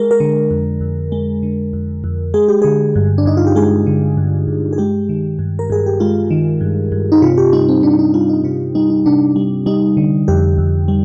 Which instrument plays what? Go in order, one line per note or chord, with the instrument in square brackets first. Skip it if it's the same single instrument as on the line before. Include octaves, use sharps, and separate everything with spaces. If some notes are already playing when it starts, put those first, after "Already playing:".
Already playing: [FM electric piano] G#3 A#4
A#4
D3
F2
F2
G#3
D3
F2
F2
G#3 G#4
G4
D3 G#4
G2
D4
G2 D#4
F4
G4
G#3 G#4
D3
G2
G2
G#4
G#3 G4
D#3
G2
A#4
G2 G#4
G4
G#3 F4
D#3
G2
G2
D#4
C3 F4
G4
G3 D#4
C4
C3 D4
D4
D#4
G3 F4
D#4
C3 F4
G3 D#4
D#4
C3 D4
G3
G3 D#4
D3
F2 G4
F2
G3